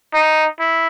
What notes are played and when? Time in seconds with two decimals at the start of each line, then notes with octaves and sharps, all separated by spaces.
0.14 D#4
0.59 E4